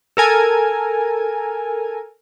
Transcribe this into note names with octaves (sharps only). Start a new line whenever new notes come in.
A4 A#4 G#5